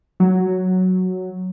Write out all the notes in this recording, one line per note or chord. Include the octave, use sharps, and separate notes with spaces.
F#3